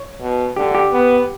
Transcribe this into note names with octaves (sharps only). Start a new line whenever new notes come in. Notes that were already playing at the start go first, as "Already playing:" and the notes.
Already playing: C#5
B2
D3 G4
G4
B3